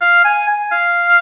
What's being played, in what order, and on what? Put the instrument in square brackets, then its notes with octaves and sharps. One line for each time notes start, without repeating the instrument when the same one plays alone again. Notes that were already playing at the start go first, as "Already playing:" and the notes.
[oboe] F5
G#5
G#5
F5